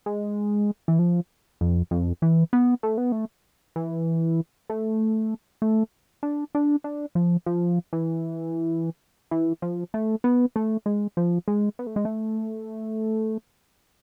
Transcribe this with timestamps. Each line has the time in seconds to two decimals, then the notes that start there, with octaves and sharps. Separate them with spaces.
0.06 G#3
0.88 E3
0.99 F3
1.61 F2
1.91 F2
2.22 E3
2.53 B3
2.83 A3
2.98 B3
3.12 A3
3.76 E3
4.70 A3
5.62 A3
6.23 D4
6.55 D4
6.84 D4
7.15 F3
7.46 F3
7.93 E3
9.31 E3
9.62 F3
9.94 A3
10.24 B3
10.56 A3
10.86 G#3
11.17 F3
11.48 G#3
11.79 B3
11.87 A3
11.96 G#3
12.05 A3